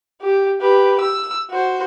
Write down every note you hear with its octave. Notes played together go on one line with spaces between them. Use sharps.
G4
G4 B4
E6
F#4 C5